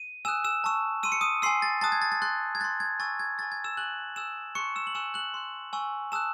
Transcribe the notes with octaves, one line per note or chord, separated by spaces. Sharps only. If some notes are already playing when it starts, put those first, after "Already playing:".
Already playing: D#7
G#5 D#6 E6 F#6 E7
E6 E7
A5 C#6 E6
C6 E6 D#7
C#7
D#6 D#7
G#5 C6 E6 C7
A6
A5 D#6 F#6 A6
G#6
A6
A6
C6 F#6 A6
G#6
C6 F#6 A6
G#6
G#5 C#6 E6 A6
G#6
G#5 C#6 E6 A6
G#6
E6 E7
G#5 C#6 E6 F#6 F#7
G#5 D#6 E6 F#6 E7
A5 C6 C#6 F#6 C#7
E6 E7
F#7
G#5 C#6 E6 F#6 E7
F#6 F#7
C6 F#6
G#5 C#6 E6
A5 D#6 E6 F#6 E7